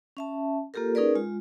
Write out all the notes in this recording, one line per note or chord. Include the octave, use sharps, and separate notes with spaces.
C#4 E5 A5
A#3 F4 G4 A4 A#4
C#4 D#4 G#4 A#4 B4 D5
G#3 F4